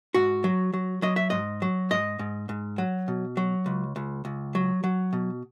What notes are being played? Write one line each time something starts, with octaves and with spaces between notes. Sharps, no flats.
G#2 F#4
F#3
F#3
F#3 D#5
E5
G#2 D#5
F#3
G#2 D#5
G#2
G#2
F#3
B2
F#3
C#2
C#2
C#2
F#3
F#3
B2